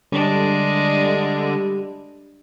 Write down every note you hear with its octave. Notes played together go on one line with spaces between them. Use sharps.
D3 G3 G#3 D4